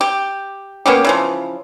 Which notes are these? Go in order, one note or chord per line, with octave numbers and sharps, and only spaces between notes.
G4
A#3 B3 C#4 G4
C#3 E3 F3